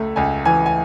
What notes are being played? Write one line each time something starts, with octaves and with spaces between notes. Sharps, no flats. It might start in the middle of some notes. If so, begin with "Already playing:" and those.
Already playing: C#2 A3 E5
C#2 G#5
E3 G#5
G#5